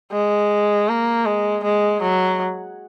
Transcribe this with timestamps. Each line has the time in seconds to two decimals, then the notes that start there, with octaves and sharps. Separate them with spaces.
0.12 G#3
0.89 A#3
1.26 G#3
1.64 G#3
2.02 F#3